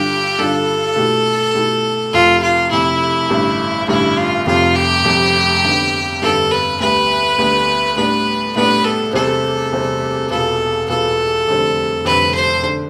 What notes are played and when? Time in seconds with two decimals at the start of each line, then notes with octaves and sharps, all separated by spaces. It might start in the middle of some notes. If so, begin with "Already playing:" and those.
Already playing: G2 D3 G3 D4 F4 G4
0.38 G2 D3 G3 D4 F4 A4
0.96 B2 A3 E4 G4
1.54 B2 A3 E4 G4
2.13 F1 F2 C3 F4
2.42 F4
2.71 F1 F2 C3 E4
3.30 A1 G2 D3 G3
3.88 A1 G2 D3 G3 E4
4.17 F4
4.46 F1 F2 C3 G3 F4
4.76 G4
5.05 F1 F2 C3 G3
5.64 G1 G2 D3 G3 B3
6.22 G1 G2 D3 G3 B3 A4
6.51 B4
6.80 D2 D3 G3 B3 B4
7.38 D2 D3 G3 B3
7.96 A2 G3 B3 D4 B4
8.55 A2 G3 B3 D4 B4
8.84 A4
9.13 E2 C3 G3 C4 A4
9.72 E2 C3 G3 C4
10.30 E1 E2 B2 B3 F4 A4
10.89 E1 E2 B2 B3 F4 A4
11.47 F1 F2 D3 G3 C4
12.05 F1 F2 D3 G3 C4 B4
12.34 C5
12.63 D3